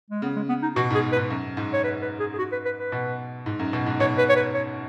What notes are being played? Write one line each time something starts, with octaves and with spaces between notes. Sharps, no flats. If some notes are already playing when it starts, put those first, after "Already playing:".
G#3
C#3 B3
G#3
B3
D#4
B2 F#4
G#2 G#4
B4
G#2
F#2
G#2
C#5
B4
B4
G#4
G#4
F#4
B4
B4
B4
B2
G#2
F#2
B2
G#2
B2 C#5
B4
C#5
B4
C#5